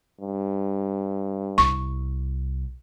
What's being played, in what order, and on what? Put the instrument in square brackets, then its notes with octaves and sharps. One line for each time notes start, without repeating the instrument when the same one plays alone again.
[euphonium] G2
[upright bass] C2 [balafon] C#6